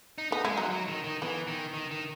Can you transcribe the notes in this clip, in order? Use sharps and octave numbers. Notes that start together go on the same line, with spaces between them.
D#4
B3 D#4
G#3 E4
F#3 D#4
F#3
D#3
D#3
E3 B3
D#3
D#3
D#3